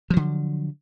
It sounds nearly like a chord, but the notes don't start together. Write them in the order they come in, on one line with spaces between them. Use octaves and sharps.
F3 F#3 D3